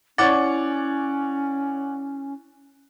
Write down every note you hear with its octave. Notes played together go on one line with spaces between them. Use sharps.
C#4 E4 C#5 D5 F#5 D6 A6